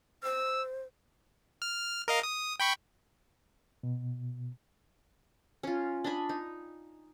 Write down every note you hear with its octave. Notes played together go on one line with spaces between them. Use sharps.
C5 E6
F6
A#4 D#5 F5
D#6
G5 B5 C#6
B2
C#4 F4
D4 D#5 G#5 B5
D#4